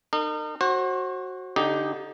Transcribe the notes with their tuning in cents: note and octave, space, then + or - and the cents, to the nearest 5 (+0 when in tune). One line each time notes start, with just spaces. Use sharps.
D#4 -35 A#4 -35
F#4 +0 C5 +35
D3 -20 D#4 +0 G4 +0